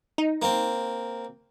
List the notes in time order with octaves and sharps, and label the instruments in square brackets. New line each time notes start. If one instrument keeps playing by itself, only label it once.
[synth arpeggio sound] D#4
[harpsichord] A#3 C4